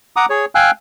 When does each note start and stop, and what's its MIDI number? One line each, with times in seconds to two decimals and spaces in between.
0.16 0.26 78
0.16 0.26 82
0.16 0.26 86
0.16 0.26 87
0.30 0.45 68
0.30 0.45 73
0.55 0.71 77
0.55 0.71 79
0.55 0.71 80
0.55 0.71 88
0.55 0.71 90